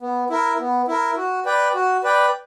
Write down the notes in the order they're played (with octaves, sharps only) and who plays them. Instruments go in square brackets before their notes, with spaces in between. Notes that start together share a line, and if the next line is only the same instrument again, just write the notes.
[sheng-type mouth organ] B3
E4 A#4
B3
E4 A#4
F#4
B4 D5 G5
F#4
B4 D5 G5